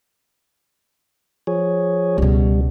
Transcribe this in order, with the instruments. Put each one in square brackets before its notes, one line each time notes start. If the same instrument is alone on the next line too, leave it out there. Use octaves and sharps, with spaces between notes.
[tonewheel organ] F3 G#4 C#5
[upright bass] C#2 B2 [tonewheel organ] G3